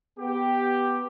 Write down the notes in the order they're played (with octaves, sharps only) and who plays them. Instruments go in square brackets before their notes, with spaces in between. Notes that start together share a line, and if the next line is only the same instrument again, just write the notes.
[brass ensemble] B3 G4